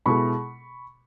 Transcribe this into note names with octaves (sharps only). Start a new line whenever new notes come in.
B2 G#3 B3 E4 A4 B5 C#6